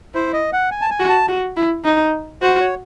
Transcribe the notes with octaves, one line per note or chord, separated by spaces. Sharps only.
E4 C5
D#5
F#5
G#5
A5
G#5
F#4
A5
F#4
E4
D#4
F#4 C5
C#5